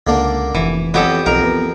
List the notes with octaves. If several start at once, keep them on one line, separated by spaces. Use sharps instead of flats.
C#2 D3 A#3 D4
F1 E3
F2 F#3 B3 G4 A4
B1 F2 A#4
B3